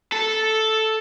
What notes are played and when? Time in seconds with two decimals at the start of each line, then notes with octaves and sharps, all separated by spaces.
0.12 A4